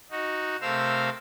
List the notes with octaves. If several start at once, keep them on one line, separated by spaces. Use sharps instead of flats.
D#4 F#4
C3 A3 A#4 C5 F5 E6